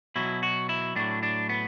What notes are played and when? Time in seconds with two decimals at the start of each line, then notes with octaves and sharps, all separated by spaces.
0.16 B2 F#3 E4
0.43 F#4
0.69 E4
0.96 A2 F#3 D4
1.23 D4
1.49 B3